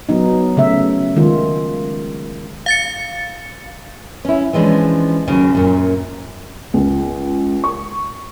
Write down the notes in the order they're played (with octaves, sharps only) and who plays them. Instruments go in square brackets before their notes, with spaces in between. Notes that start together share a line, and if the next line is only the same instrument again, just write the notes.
[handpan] F#3 B3 D#4
C#3 A3 E5
D#3 G#3 F4
[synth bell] F5 A6 C#7
[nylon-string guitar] C#4 E4
E3 F3 G#3 B3 C#4 D4
D#2 C#3 F#3
F#2 A#2
[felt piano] C#2
C#6